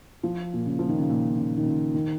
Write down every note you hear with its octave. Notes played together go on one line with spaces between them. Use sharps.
F3
A#2
C#3
F3
D#3
C#3
A#2
C#3
D#3
C#3
D#3